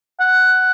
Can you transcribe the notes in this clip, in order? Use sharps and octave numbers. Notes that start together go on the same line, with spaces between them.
F#5